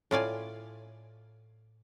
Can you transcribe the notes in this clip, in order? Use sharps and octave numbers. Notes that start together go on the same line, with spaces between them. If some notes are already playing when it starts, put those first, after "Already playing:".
A2 F4 D5 G#5